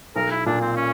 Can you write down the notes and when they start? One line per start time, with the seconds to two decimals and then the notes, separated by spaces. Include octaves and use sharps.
0.16 B1 A#4
0.31 E4
0.46 A#2 D4
0.61 C4
0.76 C#4